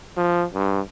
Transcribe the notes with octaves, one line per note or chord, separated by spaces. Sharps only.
F3
G2